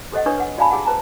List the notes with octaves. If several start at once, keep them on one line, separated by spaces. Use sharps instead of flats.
G4 A4 C5 D#5 F#5
D4 B4 C#5 C#6 D#6
B4 F#5
F#4 D5 F5 G#5 A5 B5
G4 G#4 F#5
B4 C5 A5 A#5